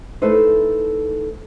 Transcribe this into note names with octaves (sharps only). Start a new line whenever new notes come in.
A3 D#4 E4 A4 B4 C5